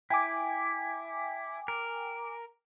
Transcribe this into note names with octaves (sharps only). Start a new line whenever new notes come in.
E4 G5 G#5 D6
A#4